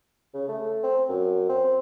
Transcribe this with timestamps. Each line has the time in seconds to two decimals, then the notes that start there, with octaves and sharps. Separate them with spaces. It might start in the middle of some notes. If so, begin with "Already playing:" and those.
0.34 C#3
0.48 A3
0.83 C4
1.09 F#2
1.49 C4